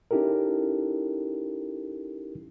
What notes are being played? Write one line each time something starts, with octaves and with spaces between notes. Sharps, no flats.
C#4 D#4 E4 G4 A4 A#4